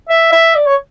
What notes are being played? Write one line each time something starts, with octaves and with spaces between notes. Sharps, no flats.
E5
E5
D5
C#5